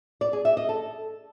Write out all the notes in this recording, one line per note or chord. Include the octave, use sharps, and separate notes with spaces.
D5
G#4
E5
D#5
A4